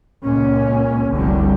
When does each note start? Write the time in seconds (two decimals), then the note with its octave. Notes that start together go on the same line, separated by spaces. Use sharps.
0.25 C#2 A#2 C#4
1.12 F1 C2 D3 F#3 G3